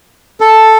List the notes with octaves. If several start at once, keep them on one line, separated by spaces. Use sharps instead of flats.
A4